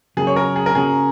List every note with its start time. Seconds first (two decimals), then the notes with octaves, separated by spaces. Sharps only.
0.17 C#3 F#3 A#3 G#4
0.27 C#5
0.36 A#4
0.56 G#4
0.66 A#4
0.75 C#3 A#3 C#4 F#4 G#4